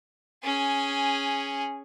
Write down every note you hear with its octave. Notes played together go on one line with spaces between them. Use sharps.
C#4 G#4